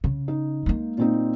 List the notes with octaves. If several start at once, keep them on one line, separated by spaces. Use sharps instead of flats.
C#3
D#4
G#3 A#3
A#2 C4 D#4